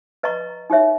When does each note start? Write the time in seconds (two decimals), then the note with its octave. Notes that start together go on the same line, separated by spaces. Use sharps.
0.23 B4 D#5 A#5 C#6
0.70 D#4 G4 C#5 E5